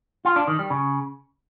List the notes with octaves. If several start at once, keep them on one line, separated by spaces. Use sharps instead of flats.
F4
D4
D#3
G3
C#3